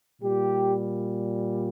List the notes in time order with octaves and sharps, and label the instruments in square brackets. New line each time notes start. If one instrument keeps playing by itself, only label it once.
[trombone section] A#2 G3 G4